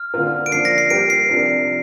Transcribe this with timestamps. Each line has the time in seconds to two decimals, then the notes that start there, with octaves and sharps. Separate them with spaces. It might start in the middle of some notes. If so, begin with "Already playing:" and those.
Already playing: F6
0.14 D3 A#3 F4 A#4
0.46 D7
0.52 F3 A#3 D4 C7
0.65 A#6
0.78 C7
0.90 G3 A#3 G4 A#4 D7
1.10 C7
1.29 C3 F3 D4 A#4